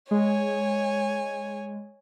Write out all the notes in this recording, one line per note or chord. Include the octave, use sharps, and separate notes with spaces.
G#3 C#5 G#5